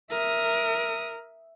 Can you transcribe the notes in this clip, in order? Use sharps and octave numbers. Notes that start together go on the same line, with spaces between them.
A#4 E5 D#6